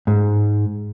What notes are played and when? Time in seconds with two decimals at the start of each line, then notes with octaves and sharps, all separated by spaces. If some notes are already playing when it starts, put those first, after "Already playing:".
0.07 G#2